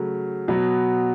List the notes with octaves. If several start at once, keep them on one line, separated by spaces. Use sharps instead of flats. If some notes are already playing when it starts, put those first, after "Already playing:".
Already playing: C#3 F#3 A3
B2 F#3 B3